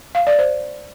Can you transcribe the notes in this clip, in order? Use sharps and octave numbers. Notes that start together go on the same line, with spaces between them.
F5
D5
C5